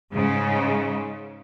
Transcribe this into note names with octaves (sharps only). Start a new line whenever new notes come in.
G#2 C#3